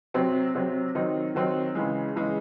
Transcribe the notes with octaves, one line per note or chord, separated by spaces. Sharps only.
C3 F#3 C4
C3 F#3 C4
D#3 F#3 C4 D#4
D#3 F#3 C4 D#4
C#3 E3 G#3
C#3 E3 G#3